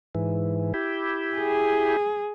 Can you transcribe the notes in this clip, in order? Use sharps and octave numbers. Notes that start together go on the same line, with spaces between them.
G#2 E3
E4 G4
G#4